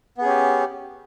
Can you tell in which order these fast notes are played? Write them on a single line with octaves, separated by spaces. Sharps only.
B3 G#4 C#4 G4